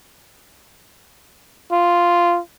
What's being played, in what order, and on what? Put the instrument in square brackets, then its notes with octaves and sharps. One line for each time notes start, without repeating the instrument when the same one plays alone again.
[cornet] F4